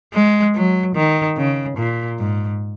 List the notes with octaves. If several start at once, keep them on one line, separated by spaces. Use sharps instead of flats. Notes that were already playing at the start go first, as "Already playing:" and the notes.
G#3
F#3
D#3
C#3
A#2
G#2